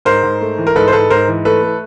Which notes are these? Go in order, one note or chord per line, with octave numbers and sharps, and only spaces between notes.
G#2 A#4 C5
G#2
A3
E3
A#4
G#2 A4 B4
C5
G#2 A4 B4
G#2 A#4 C5
E3
A3 A4 B4
A3